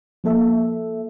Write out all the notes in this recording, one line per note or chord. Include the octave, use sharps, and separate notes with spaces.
F3 A#3 A4 E5